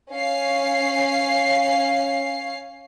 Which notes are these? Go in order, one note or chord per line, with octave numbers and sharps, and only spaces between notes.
C#4 F5 C7